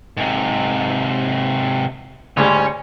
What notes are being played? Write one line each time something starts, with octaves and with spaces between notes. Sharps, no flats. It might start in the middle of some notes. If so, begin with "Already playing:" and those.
G#2 C3
D2 G#2 G3 C#4